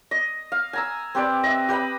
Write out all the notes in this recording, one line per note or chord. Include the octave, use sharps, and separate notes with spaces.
D#5
F5
G#5 A#5 E6
C4 G4 B4 D5
D#5 E5
G4 B4 D#5 B5